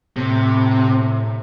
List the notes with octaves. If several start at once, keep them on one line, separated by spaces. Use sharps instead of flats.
A2 C3